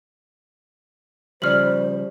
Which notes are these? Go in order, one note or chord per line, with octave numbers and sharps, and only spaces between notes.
C#3 F3 G3 C5 D5 F6 F#7